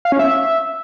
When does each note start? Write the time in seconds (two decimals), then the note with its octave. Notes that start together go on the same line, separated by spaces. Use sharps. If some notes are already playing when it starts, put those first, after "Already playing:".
0.05 F5
0.12 C#4
0.19 E5